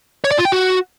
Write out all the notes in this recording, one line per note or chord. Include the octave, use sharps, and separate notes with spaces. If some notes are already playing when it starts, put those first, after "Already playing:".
C#5
D5
F4
G5
F#4